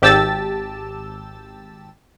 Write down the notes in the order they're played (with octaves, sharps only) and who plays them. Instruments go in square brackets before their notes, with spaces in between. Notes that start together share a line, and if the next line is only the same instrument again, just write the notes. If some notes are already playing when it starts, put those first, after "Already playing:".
[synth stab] G#1 G4 A5 E6 A6